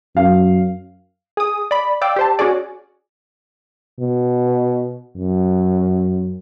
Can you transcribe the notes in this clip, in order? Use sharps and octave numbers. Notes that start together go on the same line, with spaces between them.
F#2 F5
G#4 D#6
D5 B5
D5 F5 G5 E6
G4 C5 A5
C#4 F#4 G#4 D5
B2
F#2